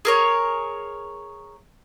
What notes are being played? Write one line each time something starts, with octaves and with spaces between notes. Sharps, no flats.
G#4 A#4 C#5